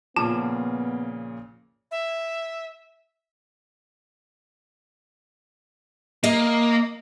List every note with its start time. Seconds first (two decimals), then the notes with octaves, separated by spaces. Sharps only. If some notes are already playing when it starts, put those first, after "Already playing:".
0.16 A#2 C#3 F3 B3 F4 A5
1.91 E5
6.24 A#3 D#5